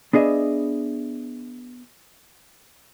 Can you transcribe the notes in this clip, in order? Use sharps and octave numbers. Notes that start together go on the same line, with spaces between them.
B3 D4 G#4 D#5 E5